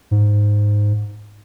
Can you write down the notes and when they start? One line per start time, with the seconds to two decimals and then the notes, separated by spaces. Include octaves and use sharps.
0.11 G#2